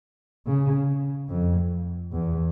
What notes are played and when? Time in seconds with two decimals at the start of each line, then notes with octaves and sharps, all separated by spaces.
0.47 C#3
1.29 F2
2.12 E2